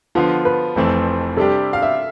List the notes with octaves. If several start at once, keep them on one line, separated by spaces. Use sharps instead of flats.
D3 F3 B3 F4
B4
F1 F2 E3 A3 C4
C3 G3 D4 G4 A4
F5
E5